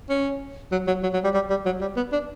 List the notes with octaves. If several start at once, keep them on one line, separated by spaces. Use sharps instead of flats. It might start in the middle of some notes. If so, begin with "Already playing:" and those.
C#4
F#3
F#3
F#3
F#3
G3
G3
G3
F#3
G3
B3
D4